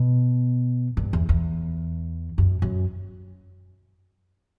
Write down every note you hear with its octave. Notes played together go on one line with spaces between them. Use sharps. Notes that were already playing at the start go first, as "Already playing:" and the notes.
Already playing: B2
G2
E2
E2
F#2
F#2